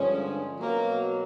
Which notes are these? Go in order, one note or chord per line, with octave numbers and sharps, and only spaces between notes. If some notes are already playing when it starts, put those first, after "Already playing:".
Already playing: G2 D3 F3 G#3 C#4
B2 F#3 A#3